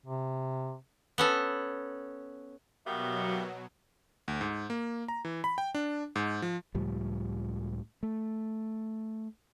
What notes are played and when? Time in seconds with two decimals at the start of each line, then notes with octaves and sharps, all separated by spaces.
0.06 C3
1.18 B3 C#4 A4
2.86 B2 F#3 G3 A#3 B3 F#4 G4 E5
4.28 D2
4.41 G#2
4.70 A#3
5.08 A#5
5.25 E3
5.44 B5
5.58 G5
5.75 D4
6.16 G#2
6.42 F3
6.75 C#2 A2 F3 G3
8.03 A3